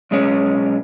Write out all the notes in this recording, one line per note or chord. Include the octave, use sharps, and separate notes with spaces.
B1 G#3 C#4